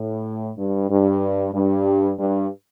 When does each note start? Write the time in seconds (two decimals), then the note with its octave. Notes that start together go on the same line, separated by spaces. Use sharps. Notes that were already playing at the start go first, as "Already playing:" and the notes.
Already playing: A2
0.58 G2
0.90 G2
1.54 G2
2.19 G2